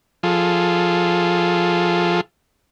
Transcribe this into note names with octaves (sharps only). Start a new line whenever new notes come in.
F3 F4 G#4 A4